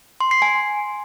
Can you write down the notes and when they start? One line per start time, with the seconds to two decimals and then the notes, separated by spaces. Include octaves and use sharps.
0.20 C6
0.31 C7
0.42 G#5